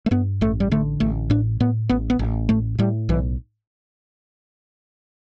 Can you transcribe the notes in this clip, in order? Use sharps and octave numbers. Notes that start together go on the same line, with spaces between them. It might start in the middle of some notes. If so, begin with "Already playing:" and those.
A3
G2 B3
A1 A3
G3
D3 A3
A1 A3
A2 D4
A2 B3
A1 B3
B3
A1
A2 A3
A2 G3
B1 E3